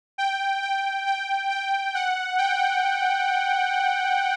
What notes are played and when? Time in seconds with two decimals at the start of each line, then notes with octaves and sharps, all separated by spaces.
0.18 G5
0.62 G5
1.06 G5
1.50 G5
1.95 F#5
2.38 G5